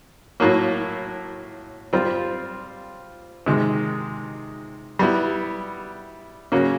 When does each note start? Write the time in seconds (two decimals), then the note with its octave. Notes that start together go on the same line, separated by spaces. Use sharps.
0.40 A2 F#3 A#3
1.93 G3 C4 F4
3.46 C3 D#3 G#3
4.99 G3 B3 E4
6.52 C#3 F#3 A#3 C#4